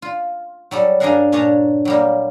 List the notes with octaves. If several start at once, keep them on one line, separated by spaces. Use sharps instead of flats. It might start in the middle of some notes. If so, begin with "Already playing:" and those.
F4
F#3 G3 A4
G2 D4 G#4 A#4 F5 F#5
A#2 D4 C#5 A5 A#5
F#3 G3 A#3